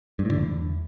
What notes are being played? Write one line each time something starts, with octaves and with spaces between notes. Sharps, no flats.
G2
A2
D3
E2